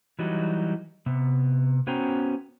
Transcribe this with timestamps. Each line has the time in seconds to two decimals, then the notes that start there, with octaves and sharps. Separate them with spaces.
0.19 E3 F#3 G3 D#4 F#4
1.06 C3 B3
1.87 B3 C#4 F#4 C5 G5 A#5